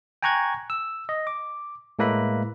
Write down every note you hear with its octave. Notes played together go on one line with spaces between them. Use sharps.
G5 G#5 A#5 C#6 F#6 G#6
E6
D#5
D6
A2 G#3 A#3 B4 E5 B5